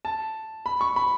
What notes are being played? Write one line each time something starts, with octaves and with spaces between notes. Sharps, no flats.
A5
B5
C#6
B5